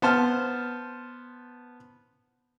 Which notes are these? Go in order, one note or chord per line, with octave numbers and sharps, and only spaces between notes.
B3 C5 A5 F6